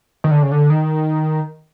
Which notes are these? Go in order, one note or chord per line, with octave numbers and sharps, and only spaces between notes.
D#3
D3
C#3
D3
D#3